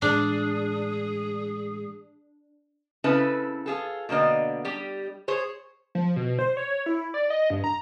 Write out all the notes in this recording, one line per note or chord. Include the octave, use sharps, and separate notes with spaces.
A2 E3 G#3 D4 G#4
C#3 C4 E4 A4 B4
F4 G#4 A4
B2 D3 A#3 D5 D#5
G3 G4
G#4 C5 C#5
F3
B2
C5
C#5
E4
D5
D#5
G2
A#5